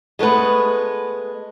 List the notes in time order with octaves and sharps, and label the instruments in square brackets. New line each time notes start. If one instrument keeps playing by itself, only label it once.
[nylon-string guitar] G#3 A3 B3 B4